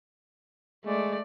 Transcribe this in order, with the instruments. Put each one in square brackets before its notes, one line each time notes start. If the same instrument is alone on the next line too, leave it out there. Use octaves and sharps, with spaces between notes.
[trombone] G#3 [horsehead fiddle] A3 D5